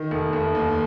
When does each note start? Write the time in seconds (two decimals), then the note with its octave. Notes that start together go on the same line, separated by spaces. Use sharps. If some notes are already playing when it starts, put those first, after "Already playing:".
Already playing: D#3
0.11 F1
0.33 F1
0.55 D#2